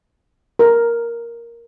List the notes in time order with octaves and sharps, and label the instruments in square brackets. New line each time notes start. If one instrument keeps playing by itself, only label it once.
[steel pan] A#4